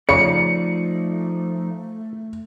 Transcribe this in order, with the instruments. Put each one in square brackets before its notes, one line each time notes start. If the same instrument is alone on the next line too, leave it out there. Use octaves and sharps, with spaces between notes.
[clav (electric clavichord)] C#3 [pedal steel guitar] F3 D#4 D5 [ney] A3 [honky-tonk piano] C#7